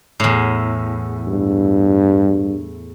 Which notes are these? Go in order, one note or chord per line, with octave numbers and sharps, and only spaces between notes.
E2 A2
G2